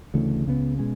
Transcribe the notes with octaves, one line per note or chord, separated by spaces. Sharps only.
D2 C#3 E3 A3
C#2 C#3 G#3 B3
B2 G#3 C#4